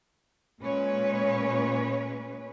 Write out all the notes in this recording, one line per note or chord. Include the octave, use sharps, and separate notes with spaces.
A#2 G#3 C#4 B4 C#5